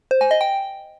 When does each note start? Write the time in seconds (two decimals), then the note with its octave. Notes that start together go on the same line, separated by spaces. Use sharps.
0.11 C5
0.21 G#5
0.31 D#5
0.41 G5